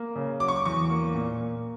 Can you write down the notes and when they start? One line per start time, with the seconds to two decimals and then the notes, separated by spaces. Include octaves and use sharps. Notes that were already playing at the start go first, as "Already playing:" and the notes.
Already playing: A#3
0.16 C#3
0.40 F#3 D6
0.48 C#6
0.56 D6
0.65 E2 C#6
0.90 A#3
1.14 A#2
1.40 A#3